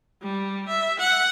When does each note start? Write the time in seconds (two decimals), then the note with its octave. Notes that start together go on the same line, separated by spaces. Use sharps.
0.21 G3
0.68 E5
0.99 F#5